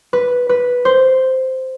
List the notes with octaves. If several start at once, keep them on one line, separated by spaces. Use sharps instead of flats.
B4
B4
C5